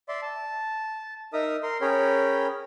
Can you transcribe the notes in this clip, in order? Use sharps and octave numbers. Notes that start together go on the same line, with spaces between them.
D5 E5 C6
A5
D#4 A#4 E5 D#6
A#4 C6
C#4 G#4 A#4 C#5 G5 B5